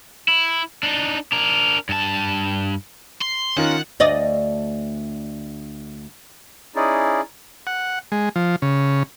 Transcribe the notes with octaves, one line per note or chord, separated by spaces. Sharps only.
E4
D4 D#4
D4 A#4
G2 A5
C6
D#3 C#4 F4 A#4 F#5
D2 D5 D#5
C#4 D#4 E4 G#4 D5
F#5
G#3
F3
C#3